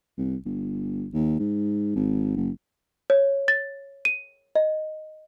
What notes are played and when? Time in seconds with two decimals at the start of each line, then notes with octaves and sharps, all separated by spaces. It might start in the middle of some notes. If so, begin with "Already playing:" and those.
0.18 C2
0.45 G1
1.13 D#2
1.39 G#2
1.96 G#1
2.36 F#1
3.10 C#5
3.48 A6
4.05 D#7
4.55 D#5